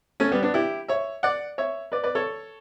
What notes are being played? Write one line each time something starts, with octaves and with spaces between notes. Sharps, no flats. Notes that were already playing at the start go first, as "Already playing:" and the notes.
A3 C#4
G3 B3
B3 D4
E4 G4
C#5 E5
D5 F#5
C#5 E5
B4 D5
B4 D5
A4 C#5